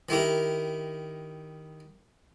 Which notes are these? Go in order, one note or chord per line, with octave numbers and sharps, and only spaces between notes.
D#3 E4 G4 A#4